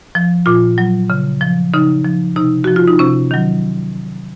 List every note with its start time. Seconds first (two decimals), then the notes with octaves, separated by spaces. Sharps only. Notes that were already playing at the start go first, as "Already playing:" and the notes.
0.15 F3
0.46 A#2 F4
0.78 F#3
1.10 C#3
1.41 F3
1.74 C#3 D#4
2.05 F3
2.36 C3 D#4
2.64 F3 F#4
2.76 F4
2.88 D#4
2.99 C3 C#4
3.31 D#3 F#3